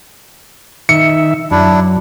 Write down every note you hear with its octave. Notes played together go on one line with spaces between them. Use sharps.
D#3 E5 C#7
F#2 D4 E4